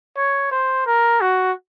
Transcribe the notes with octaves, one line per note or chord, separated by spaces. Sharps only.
C#5
C5
A#4
F#4